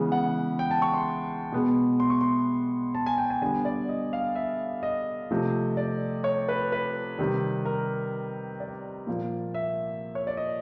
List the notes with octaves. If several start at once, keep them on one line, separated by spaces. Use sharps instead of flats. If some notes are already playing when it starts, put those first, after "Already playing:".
Already playing: C#3 E3 G#3 B3
F#5
G5
A5
C#6
C6
B2 G#3 B3
C6
C#6
C6
A5
G#5
G5
G#5
D3 G3 B3 G#5
D5
D#5
F5
E5
D#5
C3 F3 A3
D5
C#5
B4
B4
C3 D#3 G3
A#4
D5
A#2 F3 A#3
E5
C#5
D5
D#5